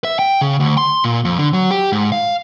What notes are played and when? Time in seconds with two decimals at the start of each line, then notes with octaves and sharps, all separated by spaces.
0.04 E5
0.19 G5
0.41 C#3
0.60 D2
0.78 C6
1.04 A#2
1.25 F2
1.38 D3
1.53 F#3
1.71 G4
1.92 G#2
2.12 F5